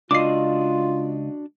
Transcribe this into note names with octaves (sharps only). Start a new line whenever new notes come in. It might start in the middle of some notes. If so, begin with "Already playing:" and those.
C#2 D4 F4 F#4 D5 D#5 D6 C7